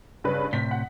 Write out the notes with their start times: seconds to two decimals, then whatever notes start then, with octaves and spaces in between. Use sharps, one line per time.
0.24 G2 C#3 B4
0.53 A2 C3 B6
0.71 F#5